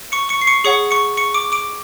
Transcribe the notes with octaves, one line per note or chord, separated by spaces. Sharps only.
C#6 C#7
C#6 C#7
C7
C#6 C#7
G#4 C#5 F#5 C#6 C#7
C#6 C#7
C#6 C#7
D6 D7
D6 D7